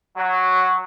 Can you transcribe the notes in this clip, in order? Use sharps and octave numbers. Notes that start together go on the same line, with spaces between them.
F#3